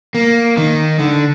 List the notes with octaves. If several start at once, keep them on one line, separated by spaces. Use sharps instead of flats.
A#3
D#3
D3